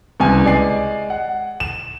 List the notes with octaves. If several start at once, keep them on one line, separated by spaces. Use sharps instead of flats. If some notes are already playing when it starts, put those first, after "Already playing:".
C2 C#3 B4 G#5
G#3 D5 G#5 C7
F#5
E7